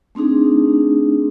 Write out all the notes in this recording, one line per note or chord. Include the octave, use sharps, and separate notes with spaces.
A3 C4 D4 D#4 G#4